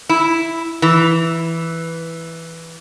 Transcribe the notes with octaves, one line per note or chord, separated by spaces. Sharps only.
E4
E3